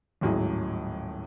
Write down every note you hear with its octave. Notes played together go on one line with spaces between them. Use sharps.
D#1 G#1 A2 F#3 G#4